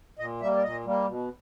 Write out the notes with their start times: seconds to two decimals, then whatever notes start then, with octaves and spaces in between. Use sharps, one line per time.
0.19 A#2 D#5
0.41 G3 A#3 E5
0.56 D5
0.63 A#2 D#5
0.85 G3 A#3
1.07 B2